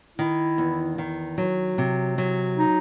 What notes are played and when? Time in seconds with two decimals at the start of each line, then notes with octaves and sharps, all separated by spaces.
0.18 D#3 E4
0.58 E2
0.98 D#3
1.38 F#3
1.78 C3
2.18 F#3
2.57 D#4